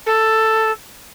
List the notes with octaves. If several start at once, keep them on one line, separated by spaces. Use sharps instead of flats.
A4